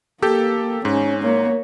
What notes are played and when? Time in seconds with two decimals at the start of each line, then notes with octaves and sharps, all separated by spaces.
0.22 A#3 G4 A4 G6
0.85 G#2 C#4
1.23 A#3 C#5